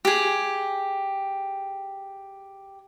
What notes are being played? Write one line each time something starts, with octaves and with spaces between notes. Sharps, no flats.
G4 G#4